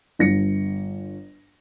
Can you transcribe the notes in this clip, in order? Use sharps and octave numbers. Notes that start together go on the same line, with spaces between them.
G1 A#6 C#7